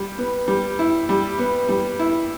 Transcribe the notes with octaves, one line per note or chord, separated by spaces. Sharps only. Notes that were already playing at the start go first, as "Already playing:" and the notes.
Already playing: G3
B3
G3
E4
G3
B3
G3
E4